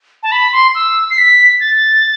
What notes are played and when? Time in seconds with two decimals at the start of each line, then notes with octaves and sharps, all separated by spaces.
0.23 A5
0.32 B5
0.52 C6
0.75 E6
1.10 C7
1.18 B6
1.60 A6